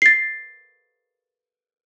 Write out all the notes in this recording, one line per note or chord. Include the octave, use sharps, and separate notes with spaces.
A6 C7